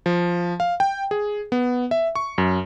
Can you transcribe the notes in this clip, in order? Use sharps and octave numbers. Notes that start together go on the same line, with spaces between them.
F3
F5
G5
G#4
B3
E5
C#6
F#2